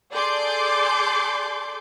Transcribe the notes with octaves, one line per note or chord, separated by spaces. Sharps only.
G#4 A4 D5 C6 D6 G6